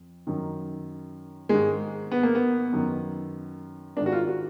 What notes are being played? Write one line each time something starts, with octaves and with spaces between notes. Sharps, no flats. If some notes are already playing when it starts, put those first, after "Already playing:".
Already playing: F2
F#2 D#3
G#2 D#3 G#3
B3
A#3
B3
F#2 D#3
G#2 D#3 D4
F#4
F4
F#4